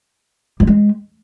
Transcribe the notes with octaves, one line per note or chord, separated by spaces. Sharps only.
G3
G#3